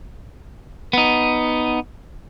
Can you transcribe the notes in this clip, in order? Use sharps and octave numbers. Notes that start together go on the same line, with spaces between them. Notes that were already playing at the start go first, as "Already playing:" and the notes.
B3 D#4